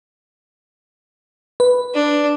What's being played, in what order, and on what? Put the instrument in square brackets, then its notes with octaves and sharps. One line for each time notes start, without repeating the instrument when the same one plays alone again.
[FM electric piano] B4
[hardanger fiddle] D4